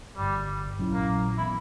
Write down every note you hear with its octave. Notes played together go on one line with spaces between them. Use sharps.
G1 G2 D3 G3
A#1 A#2 F#3 C#4 E4
A#3
E3 B3 E4